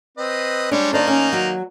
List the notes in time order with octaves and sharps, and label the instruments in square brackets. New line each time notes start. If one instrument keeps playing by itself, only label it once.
[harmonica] C4 B4 D#5
[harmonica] G3 G#3 C#5 [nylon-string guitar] D4
[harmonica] D#3 A#3 D#4 [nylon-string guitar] D4 C5 D5
[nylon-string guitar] C#4
F#3